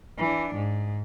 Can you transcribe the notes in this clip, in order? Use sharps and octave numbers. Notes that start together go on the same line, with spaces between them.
E3 D4
G#2